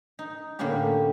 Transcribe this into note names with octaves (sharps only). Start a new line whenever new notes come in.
D#4
A2 D3 A#3 B3 C#4 G4